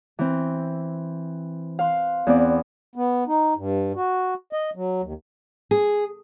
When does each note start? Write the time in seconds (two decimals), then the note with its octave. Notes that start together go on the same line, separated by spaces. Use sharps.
0.19 E3 C4
1.79 F5 C6 F#6
2.27 E2 B3 C4 D5
2.96 B3
3.28 D#4
3.57 G2
3.96 F#4
4.53 D#5
4.76 F#3
5.02 D#2
5.71 G#4